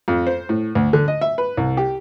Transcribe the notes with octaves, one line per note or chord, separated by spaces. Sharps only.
F2
C5
A2
D2
D3
D#5
E5
B4
C2
G4